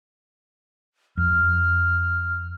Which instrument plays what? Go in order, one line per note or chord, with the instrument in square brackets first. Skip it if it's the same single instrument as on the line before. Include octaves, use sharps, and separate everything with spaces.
[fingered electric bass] F2 [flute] F6